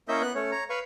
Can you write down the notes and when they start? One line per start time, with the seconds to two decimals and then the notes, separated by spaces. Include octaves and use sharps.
0.08 A#3 C#4 E4 D#5 E5 G6
0.22 B3 F#6
0.35 A3 C#4 C#5
0.52 C#5 A#5
0.70 B4 F5 C#6